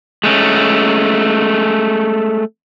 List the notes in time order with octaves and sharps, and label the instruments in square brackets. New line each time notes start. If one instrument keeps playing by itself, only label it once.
[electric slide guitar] G#3 A3 C#4